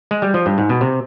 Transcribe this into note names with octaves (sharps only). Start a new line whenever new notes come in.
G#3
G3
F3
G2
G#2
B2
C3